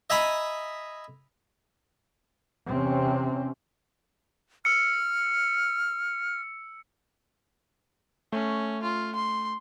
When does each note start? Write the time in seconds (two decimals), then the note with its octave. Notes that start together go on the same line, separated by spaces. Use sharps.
0.10 D#5 E5 G#5 A#5 B5 D#6
2.69 E2 C3 C4 C#4
4.65 E6 F6 C#7
8.32 A3 C#4
8.83 F4
9.16 C6